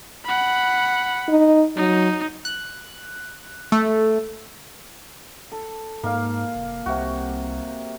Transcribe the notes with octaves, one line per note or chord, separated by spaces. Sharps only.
F#5 B5
D#4
F#3 D#4
F#6
A3
A4
G#2 A#3 F5
F1
C2 C3 F#4